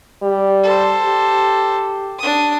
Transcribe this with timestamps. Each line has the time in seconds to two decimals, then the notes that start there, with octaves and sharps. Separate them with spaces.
0.23 G3
0.64 A4 C5
1.05 G4
2.19 D4 D#6